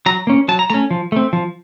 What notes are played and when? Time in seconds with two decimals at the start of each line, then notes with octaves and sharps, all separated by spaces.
0.06 F#3 A#5
0.27 A#3 C#4
0.48 F#3 A5
0.59 A#5
0.70 A3 C#4 A#5
0.91 F3
1.12 A3 C4
1.33 F3